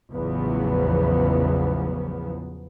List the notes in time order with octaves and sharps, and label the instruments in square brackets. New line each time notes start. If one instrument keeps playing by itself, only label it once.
[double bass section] A1 E2 C#3 F3 F#3 B3